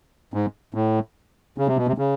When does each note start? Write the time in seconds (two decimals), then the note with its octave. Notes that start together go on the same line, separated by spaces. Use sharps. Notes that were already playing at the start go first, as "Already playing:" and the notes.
0.34 G#2
0.74 A2
1.58 C#3
1.68 C3
1.77 B2
1.87 C3
1.98 C#3